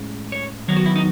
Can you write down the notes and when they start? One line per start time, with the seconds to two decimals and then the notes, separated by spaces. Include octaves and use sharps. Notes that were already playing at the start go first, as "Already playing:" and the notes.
Already playing: A2 G#3 C#4
0.32 C#5
0.68 D#3 F#3 B3 C#5
0.77 F#4
0.86 E4
0.96 D#4